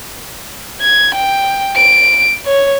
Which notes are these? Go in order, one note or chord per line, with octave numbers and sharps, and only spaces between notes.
G#6
G5
D7
C#5